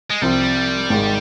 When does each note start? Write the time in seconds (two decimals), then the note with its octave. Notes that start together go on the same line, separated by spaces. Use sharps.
0.10 G#3
0.21 C2 C3 F3 G3 C4
0.90 G#1 G#2 D#3 G#3